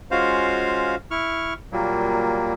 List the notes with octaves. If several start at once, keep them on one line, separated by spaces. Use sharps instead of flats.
G#3 C#4 F4 F#4 C5 F5
E4 C#6 F6
A#2 F#3 G3 A#3